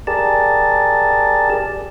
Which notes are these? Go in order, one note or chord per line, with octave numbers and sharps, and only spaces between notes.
G4 G#4 A#4 D5 A5